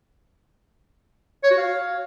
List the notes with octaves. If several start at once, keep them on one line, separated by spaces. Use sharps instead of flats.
C#5
F#4
F5